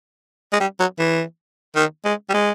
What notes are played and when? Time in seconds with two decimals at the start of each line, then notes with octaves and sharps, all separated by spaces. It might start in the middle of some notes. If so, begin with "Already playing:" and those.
0.53 G#3
0.60 G3
0.80 F#3
0.99 E3
1.76 D#3
2.05 G#3
2.29 G3
2.34 G#3